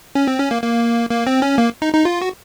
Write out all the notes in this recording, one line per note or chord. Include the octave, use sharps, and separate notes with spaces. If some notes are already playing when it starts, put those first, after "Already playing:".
C#4
C4
C#4
A#3
A#3
A#3
C4
C#4
A#3
D#4
D#4
F4
F#4